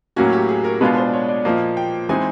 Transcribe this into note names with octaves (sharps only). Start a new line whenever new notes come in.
A2 F#3 A#3 C#4 F#4
G4
G#4
A#4
B2 G#3 B3 D4 F4 B4
C5
C#5
D5
A#2 F3 A#3 D#5
G5
E3 G#3 C4 D#4 G#5